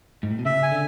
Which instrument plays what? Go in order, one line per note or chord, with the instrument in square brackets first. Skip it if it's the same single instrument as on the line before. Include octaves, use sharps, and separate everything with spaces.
[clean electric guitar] G#2
A2
B2
[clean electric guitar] C#3 [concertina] E5
[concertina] G#5
[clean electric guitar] D3